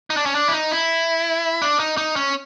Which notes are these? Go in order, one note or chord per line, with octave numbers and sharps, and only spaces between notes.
D#4
D4
C#4
D4
E4
D#4
E4
D4
D#4
D#4
C#4